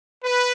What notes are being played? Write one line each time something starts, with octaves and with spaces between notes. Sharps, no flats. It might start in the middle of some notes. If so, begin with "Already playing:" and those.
B4